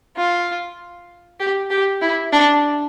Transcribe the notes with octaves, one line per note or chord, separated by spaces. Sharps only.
F4
G4
G4
E4
D4